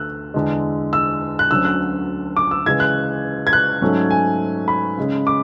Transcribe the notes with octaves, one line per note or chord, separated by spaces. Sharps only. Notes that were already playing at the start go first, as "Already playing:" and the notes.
Already playing: D2 D3 A3 E6 F#6
E2 D3 G#3
E6
F#6
D2 D3 F#3 C#4 E6
F#6
D6
E6
C#3 E3 G#3 G#6
F#6
G#6
F#6
G#2 F#3 A3 C#4
G#5
B5
C#3 G#3 C#4
D6